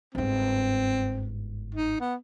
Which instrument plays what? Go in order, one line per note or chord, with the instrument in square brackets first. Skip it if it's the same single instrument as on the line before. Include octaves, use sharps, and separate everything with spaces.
[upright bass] G1 G#2 [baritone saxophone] C4
[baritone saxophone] D#4
B3